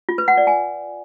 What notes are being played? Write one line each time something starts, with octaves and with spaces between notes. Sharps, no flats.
F4
B4
F#5
D5
G#5